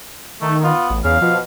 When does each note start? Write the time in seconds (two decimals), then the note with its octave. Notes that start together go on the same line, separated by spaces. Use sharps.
0.42 D#3 A3
0.64 B3 F4
0.90 A1
1.04 E2 C#3 F5
1.21 B2 F3